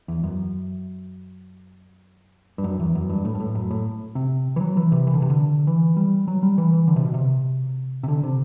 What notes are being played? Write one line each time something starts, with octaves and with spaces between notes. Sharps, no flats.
E2
F#2
G2
F#2
E2
F#2
G2
A2
G2
A2
F#2
A2
C3
E3
F#3
E3
C3
E3
D3
C3
D3
E3
G3
F#3
G3
E3
E3
D3
C3
B2
C3
C3
D3
C3